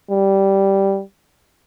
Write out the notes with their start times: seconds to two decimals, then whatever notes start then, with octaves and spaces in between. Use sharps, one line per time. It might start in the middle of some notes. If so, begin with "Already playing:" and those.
0.11 G3